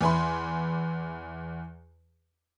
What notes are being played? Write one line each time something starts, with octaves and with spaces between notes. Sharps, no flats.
E2 E3 G#5 B5 C6